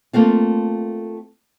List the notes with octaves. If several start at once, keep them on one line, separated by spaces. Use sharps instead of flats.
A3 A#3 C4 F4